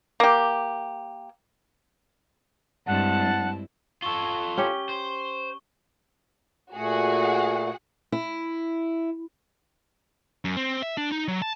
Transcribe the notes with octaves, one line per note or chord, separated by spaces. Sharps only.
A#3 G4
G2 G#3 C4 E4 F#5 A5
F4 A4 C#6 G7
C#4 G4 C#5 G7
C5
A#2 A3 F#4 G#4 F#5
E4
F#2
C4
E5
D4
D#4
F#3
A5